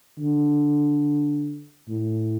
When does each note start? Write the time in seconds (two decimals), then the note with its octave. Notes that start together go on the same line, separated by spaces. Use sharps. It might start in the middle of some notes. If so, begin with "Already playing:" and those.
0.19 D3
1.89 A2